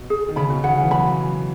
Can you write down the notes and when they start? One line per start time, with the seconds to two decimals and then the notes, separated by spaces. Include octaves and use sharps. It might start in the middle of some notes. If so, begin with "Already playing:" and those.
Already playing: B2
0.10 G#4
0.29 D#3
0.36 C#3 B5
0.50 B2
0.64 C#3 F#5
0.80 E3
0.91 F#3 B5